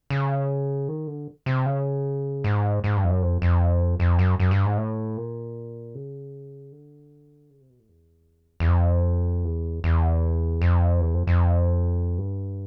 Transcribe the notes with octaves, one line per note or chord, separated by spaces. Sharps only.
C#3
D#3
D3
C3
C#3
G#2
G#2
G2
F2
F#2
F2
F2
F2
F#2
F#2
G2
G#2
A2
A#2
C#3
D3
C#3
C3
B2
A2
E2
E2
F2
E2
E2
F2
E2
F2
F2
G2